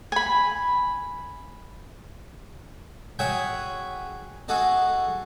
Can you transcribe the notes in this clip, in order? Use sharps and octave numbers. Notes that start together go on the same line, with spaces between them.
G#5 B5
F#4 G#4 C#5 E5 G5 G#5
F#4 G#4 A4 D#5